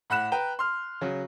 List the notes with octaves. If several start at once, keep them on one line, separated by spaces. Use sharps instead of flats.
A2 F#5 B5 F#6 E7
B4 G5 A#5
C6 F6
C#3 F#3